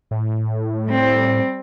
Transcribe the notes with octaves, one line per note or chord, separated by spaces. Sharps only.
A2
G3 C4